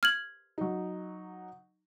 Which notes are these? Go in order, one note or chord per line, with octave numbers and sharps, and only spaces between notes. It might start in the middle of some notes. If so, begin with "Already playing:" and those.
F6 G#6 F#7
F#3 D#4